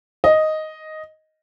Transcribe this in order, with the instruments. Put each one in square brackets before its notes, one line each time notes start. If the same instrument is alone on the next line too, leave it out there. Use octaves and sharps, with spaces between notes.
[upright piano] D#5